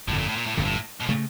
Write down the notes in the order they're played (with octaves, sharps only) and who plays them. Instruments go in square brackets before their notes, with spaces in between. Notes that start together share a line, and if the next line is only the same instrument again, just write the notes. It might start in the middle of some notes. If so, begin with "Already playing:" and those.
[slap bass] G1 F2 D3 [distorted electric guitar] A2
[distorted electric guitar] A#2
A2
A#2
A2
[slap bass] G1 F2 D3 [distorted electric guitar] A#2
[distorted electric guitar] A2
B2
[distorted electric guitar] A#2 [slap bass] C#3 E3 A3